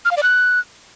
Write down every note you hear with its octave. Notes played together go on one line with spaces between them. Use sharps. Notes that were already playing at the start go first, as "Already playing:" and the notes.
F6
F5
D5
F#6